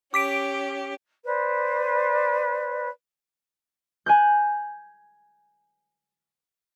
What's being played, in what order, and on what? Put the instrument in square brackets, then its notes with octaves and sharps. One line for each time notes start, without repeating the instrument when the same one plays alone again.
[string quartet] C#4 G4 [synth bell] D6 B6 D7
[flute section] B4 C5 D5
[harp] G#5 F#6 G6